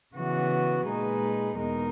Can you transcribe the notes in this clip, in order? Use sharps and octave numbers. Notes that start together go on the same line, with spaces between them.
C#3 E3 B3 F#4
A#2 G#3 D#4 G#4 B4
E2 B2 G#3 D#4 A#4